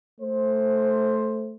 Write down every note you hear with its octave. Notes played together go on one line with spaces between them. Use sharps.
A3 C5